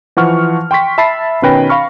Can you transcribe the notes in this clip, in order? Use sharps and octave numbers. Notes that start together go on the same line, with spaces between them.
E3 F3 F#5 C#6 F6
G5 C6 C#6 B6
E5 A5 B5 A6 C7
B2 D#3 C#4 B4 G5 A#6
F5 B5 C#6 F6